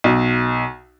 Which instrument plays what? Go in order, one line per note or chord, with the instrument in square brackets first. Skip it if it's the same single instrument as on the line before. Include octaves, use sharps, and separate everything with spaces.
[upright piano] B1